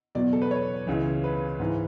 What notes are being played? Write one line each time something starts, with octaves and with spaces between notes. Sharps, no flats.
E2 B2 F#3 D5
A4
B4
C#5
C#2 C#3 E3
B4
G#2 E3